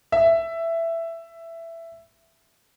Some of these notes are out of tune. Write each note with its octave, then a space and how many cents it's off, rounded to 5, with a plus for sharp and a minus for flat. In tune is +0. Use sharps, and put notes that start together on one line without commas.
E5 +10